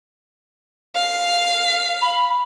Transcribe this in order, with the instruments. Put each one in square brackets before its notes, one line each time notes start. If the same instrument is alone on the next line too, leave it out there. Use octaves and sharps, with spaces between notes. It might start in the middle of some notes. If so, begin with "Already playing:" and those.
[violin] F5 C7
[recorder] B5